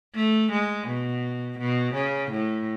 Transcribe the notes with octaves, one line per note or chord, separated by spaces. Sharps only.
A3
G#3
B2
B2
C#3
A2